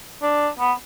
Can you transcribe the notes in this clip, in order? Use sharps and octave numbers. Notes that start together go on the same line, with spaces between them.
D4
B3